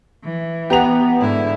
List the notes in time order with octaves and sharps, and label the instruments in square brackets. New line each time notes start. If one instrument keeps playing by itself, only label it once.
[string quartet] E3
[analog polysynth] B3 [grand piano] G4 A#5 F7
[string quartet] G#2 D3 E4